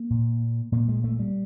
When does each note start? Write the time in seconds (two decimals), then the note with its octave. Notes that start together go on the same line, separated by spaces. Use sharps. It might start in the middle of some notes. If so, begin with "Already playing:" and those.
Already playing: A#3
0.10 A#2
0.72 A#2 A#3
0.88 G#3
1.04 A3
1.19 G3